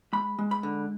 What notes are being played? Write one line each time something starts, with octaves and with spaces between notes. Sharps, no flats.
G#3 B5
G#3
B5
D3